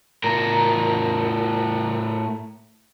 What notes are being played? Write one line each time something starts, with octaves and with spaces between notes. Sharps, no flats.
A2 A#4